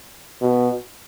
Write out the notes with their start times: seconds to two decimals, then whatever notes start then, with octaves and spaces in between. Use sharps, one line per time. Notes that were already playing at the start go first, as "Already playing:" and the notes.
0.41 B2